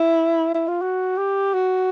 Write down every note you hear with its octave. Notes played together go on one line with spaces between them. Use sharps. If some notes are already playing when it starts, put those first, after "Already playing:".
Already playing: E4
E4
F4
F#4
G4
F#4